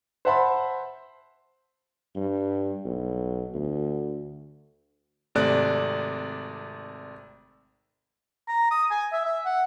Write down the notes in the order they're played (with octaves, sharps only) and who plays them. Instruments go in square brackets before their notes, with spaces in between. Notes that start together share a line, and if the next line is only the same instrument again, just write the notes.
[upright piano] C5 E5 F#5 A5 B5 C6
[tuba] G2
B1
D2
[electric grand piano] G#1 C3 A3 D5 F#6
[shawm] A#5
D#6
G#5
E5
E5
F#5